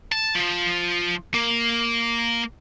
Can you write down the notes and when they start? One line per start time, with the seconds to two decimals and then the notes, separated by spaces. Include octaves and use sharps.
0.12 A5
0.35 F3
1.34 A#3